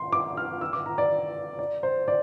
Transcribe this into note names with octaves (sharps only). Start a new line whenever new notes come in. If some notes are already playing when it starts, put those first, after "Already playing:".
Already playing: C6
D6
F6
E6
D6
A#5
D5
D5
C5
D5